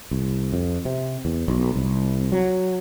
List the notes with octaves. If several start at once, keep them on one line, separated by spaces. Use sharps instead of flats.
C2
F2
C3
E2
B1
C2
F#3